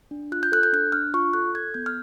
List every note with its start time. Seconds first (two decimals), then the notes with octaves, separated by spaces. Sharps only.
0.11 D4
0.32 F4 F#6
0.43 G6
0.52 A4 F#6
0.63 G6
0.73 D4 F#6
0.92 D4 F6
1.14 F4 C#6
1.33 A4 F#6
1.54 A4 G#6
1.74 B3 G6
1.86 F6